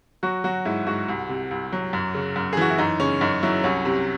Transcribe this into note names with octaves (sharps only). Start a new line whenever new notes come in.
F#3 F#4
F#3 F#4
G#2 E4
G#2 F#4
C2
C3
C2
F#3
F#2
C#3
F#2
G#4
E3 F#4
E4
F#2 D#4
C#3 C#4
F#2 D#4
F#3 E4
C2 C#4
C3